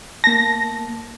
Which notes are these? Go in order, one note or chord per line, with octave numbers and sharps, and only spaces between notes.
A#3 A5 A#6